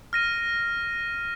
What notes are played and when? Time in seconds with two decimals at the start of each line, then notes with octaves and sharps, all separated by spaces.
0.13 F6 A#6 D#7